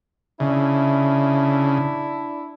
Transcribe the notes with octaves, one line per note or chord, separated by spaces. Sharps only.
C#3 D4 E4